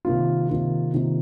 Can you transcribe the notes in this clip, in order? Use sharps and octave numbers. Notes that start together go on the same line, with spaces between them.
C3 D#3 A#3 F4
C3 D#3 A#3 F4
C3 D#3 A#3 F4